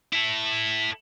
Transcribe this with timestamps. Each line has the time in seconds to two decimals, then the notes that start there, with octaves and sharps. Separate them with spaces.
0.13 E4 A4